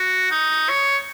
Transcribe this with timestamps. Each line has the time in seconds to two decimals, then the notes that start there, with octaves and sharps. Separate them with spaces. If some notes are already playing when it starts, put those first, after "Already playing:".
Already playing: F#4
0.31 D#4
0.69 C#5